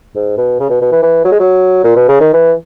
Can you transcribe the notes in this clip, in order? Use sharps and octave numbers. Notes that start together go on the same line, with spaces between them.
G#2
B2
C#3
B2
B2
E3
E3
F#3
G#3
F#3
A#2
B2
C#3
D#3
E3